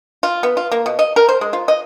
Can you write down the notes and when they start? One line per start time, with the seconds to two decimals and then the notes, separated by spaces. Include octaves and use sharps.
0.23 F4
0.43 B3
0.57 F4
0.72 A#3
0.86 B2
0.99 D#5
1.16 A#4
1.29 C5
1.41 G#3
1.53 F4
1.68 D#5